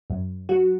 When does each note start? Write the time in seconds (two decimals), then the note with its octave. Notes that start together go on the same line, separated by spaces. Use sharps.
0.10 F#2
0.49 F#3 F#4